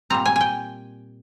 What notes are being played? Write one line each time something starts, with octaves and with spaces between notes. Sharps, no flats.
A#2 G3 C4 A#5
G#5
G5 G#5